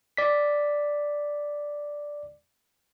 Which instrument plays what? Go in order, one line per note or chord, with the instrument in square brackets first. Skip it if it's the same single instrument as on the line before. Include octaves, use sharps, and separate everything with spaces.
[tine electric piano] D5 B6